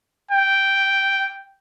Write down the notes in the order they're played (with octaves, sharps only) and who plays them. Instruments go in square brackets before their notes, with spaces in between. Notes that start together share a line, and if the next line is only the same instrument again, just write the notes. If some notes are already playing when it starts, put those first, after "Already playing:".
[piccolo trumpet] G5